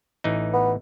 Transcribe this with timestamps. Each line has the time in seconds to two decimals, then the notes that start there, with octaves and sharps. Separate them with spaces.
0.24 A1 E3 D#4
0.54 B3